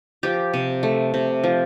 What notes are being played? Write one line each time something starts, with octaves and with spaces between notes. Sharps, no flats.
F3 G4
C3
A3
C3
F3